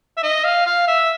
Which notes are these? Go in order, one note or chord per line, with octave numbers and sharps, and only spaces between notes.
E5
D#5
F5
F5
E5